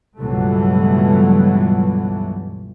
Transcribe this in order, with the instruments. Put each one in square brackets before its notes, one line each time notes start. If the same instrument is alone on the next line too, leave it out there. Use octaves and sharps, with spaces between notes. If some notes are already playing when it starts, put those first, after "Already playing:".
[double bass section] C#2 G2 B2 E3 F#3 A3